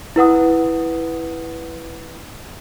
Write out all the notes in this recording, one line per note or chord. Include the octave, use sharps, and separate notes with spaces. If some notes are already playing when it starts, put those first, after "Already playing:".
E4 B4 F#5 D#6